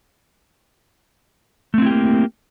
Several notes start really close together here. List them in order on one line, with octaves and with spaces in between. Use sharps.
A3 C4 E4 G4 A#3